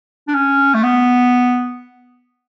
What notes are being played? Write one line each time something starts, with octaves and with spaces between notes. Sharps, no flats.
D4
C#4
A3
B3